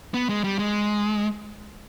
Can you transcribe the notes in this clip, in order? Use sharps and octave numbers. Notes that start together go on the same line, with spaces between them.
B3
G#3
G3
G#3